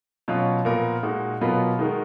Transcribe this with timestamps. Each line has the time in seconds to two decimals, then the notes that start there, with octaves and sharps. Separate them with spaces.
0.28 B2 F#3 C#4 F4
0.65 A#2 F3 B3 F4 A#4
1.03 A#2 G#3 D#4 F#4
1.41 B2 F#3 B3 F4 A#4
1.79 D#3 G#3 D#4 F#4 A#4